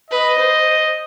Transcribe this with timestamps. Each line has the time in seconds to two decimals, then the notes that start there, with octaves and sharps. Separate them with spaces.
0.11 B4 D#5
0.39 C5